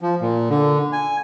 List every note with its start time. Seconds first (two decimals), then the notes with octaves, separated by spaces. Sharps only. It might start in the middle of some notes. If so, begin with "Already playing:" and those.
0.01 F3
0.21 A#2
0.50 D3
0.92 G#5